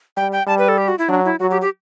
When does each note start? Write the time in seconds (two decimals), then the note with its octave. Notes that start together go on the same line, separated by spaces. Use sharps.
0.17 G3 G5
0.32 G5
0.47 G3 A5
0.58 B4
0.69 A4
0.78 G4
0.88 F#4
0.99 E4
1.09 F#3 D4
1.25 E4
1.40 F#3 F#4
1.51 G4
1.62 G4